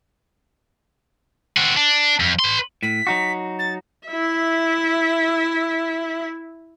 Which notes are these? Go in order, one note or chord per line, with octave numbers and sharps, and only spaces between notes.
C4 F#4
D4
F2
B4 C6
A2 B6
F#3 D#4 F#4
A6
E4 E5